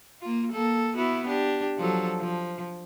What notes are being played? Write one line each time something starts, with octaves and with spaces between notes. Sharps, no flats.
A#3 F4
A#3 A4
B3 E4 F#4
D4 G4
F3 F#3 A4
F3